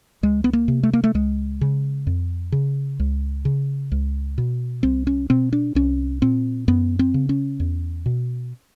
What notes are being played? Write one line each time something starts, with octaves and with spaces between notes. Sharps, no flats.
C#2 G#3
B3
A#3
C3
A3
A#3
A3
C#2 G#3
C#3
F2
C#3
C#2
C#3
C#2
B2
C2 C4
C#4
B2 C4
D4
C2 C#4
A#2 C4
F#2 B3
C4
C#3
C#4
E2
B2